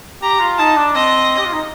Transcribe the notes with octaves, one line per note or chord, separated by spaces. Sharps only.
G4 A#5
F4
D#4 A5
D4
C4 D#5
G4
F4
D#4